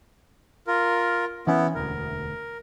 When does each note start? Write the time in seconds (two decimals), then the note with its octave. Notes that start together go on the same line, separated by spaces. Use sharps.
0.67 F4 A#4
1.47 E3 B3 C#4 E4
1.75 E1 D2 A#4